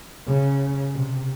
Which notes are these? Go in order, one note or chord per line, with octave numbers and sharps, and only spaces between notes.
C#3
C3